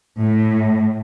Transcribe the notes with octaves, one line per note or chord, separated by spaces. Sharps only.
A2